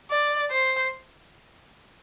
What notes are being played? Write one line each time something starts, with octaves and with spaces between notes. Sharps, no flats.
D5
C5